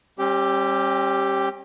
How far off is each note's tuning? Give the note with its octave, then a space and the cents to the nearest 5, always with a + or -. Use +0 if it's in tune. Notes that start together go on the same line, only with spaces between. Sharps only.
G3 +5 C#4 -45 G4 +0